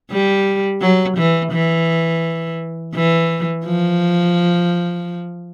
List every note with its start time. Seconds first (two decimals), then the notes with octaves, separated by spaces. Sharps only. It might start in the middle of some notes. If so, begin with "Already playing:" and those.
0.11 G3
0.81 F#3
1.17 E3
1.52 E3
2.94 E3
3.65 F3